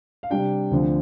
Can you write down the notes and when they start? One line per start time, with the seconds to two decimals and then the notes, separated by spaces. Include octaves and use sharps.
0.23 F5
0.30 C3 G3 D4 G5
0.71 D2 D3 F3 C4